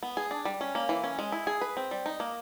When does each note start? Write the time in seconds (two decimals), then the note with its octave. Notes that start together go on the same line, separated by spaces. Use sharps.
0.03 B3
0.17 G#4
0.31 D4
0.45 G3
0.61 C#4
0.75 A#3
0.89 E3
1.04 C#4
1.19 G#3
1.32 E4
1.47 G#4
1.61 B4
1.77 C4
1.91 G3
2.06 D#4
2.20 A#3